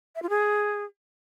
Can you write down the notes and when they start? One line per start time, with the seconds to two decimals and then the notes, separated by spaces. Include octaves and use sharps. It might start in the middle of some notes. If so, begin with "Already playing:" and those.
0.15 E5
0.23 F4
0.30 G#4